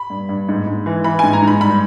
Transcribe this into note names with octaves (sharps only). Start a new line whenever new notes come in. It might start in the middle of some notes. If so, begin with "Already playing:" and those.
Already playing: B5
G2
G2
G#2
G#2
E3
E3 B5
G#2 G#5
A#5
G#2
B5
G2 B5